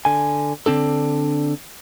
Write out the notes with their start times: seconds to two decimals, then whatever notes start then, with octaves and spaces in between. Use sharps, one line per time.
0.05 D3 G#5
0.66 D3 C4 D4 A4